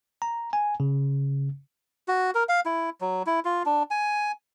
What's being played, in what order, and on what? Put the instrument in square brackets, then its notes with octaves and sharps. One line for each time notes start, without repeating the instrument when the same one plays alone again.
[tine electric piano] A#5
G#5
C#3
[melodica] F#4
A#4
F5
E4
F#3
E4
F4
D4
G#5